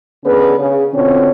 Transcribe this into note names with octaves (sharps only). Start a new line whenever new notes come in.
D3 B3 C#4 G#4 B4
C#3
B2 D3 C4 C#4 F4 C#5